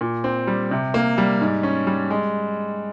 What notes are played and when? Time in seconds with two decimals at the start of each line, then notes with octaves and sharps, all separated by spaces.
0.01 A#2
0.24 C4
0.47 G3
0.71 C3
0.94 A#3
1.18 G3
1.41 G#2
1.63 C#4
1.87 G3
2.10 G#3